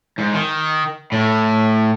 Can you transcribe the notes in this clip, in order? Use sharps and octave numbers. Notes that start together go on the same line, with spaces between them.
G#2
D#3
A2